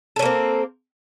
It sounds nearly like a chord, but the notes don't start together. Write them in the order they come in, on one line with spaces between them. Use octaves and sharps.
A4 C#4 A#3 C4